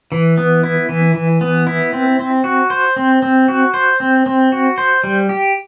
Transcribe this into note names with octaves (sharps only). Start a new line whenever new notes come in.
E3
B3
E4
E3
E3
B3
E4
C4
C4
F#4
C5
C4
C4
F#4
C5
C4
C4
F#4
C5
G3
G4